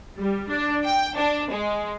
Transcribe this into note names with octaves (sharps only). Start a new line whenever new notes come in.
G3
D4
G5
D4
G#3